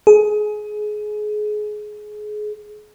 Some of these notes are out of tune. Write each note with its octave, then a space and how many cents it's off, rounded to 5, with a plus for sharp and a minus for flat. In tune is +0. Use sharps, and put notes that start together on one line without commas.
G#4 +25